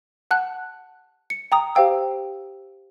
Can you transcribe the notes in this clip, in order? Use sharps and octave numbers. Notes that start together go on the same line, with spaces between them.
F#5 A5 F#6
C#7
G5 A#5 D#6
G4 C5 F5 G5 E6